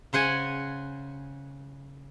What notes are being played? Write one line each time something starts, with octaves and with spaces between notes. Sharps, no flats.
C#3 C5 F#5 G#5